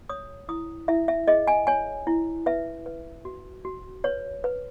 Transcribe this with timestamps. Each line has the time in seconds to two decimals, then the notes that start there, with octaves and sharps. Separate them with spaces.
0.09 C#5 D#6
0.49 E4 D#6
0.88 E4 E5
1.08 E5
1.28 G#4 D#5
1.48 G#5
1.67 C#5 G#5
2.07 E4
2.46 B4 E5
2.86 B4
3.25 F#4
3.65 F#4
4.04 B4 C#5
4.44 B4